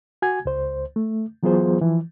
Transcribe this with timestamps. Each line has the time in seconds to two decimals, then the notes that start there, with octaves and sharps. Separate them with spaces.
0.22 F#4 G#5 G#6
0.45 C#2 C5
0.96 A3
1.43 E3 F#3 B3 F4 G#4 C5
1.81 E3 F3